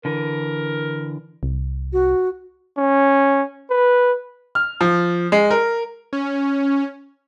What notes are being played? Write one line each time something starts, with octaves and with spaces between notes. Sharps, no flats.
D3 E3 A#4
C2
F#4
C#4
B4
F6
F3
G#3
A#4
C#4